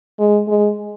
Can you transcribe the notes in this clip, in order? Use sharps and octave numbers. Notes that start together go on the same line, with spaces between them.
G#3
G#3